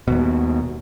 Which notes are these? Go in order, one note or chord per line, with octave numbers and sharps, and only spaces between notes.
D#2 B2